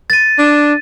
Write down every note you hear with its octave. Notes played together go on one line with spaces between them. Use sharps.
A6 D#7
D4